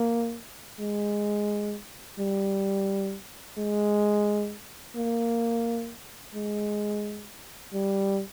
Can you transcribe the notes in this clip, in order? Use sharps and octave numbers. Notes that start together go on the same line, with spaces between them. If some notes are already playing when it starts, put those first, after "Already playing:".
Already playing: A#3
G#3
G3
G#3
A#3
G#3
G3